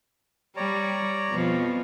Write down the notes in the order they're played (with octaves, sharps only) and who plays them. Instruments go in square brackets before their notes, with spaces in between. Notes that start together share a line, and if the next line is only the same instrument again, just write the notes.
[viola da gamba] G3 [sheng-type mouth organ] C#5 D5 A#5
[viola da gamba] F2 B2 F3